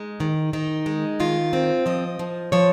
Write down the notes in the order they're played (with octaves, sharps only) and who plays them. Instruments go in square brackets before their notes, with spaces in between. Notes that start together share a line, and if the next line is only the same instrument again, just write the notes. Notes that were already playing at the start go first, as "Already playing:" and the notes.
Already playing: [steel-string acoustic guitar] G#3 D#4
D#3
D#3 D#4
G#3
D#3 F4
C4
F3 D#5
F3
F3 C#5